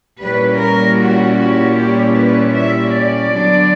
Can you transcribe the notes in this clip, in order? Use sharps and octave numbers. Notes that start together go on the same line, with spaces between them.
A#2 G3 A#3 C#4 E4 B4
A#4
F#4
F#4
G4
B4
E5
D5
D3 F#3 B3 D4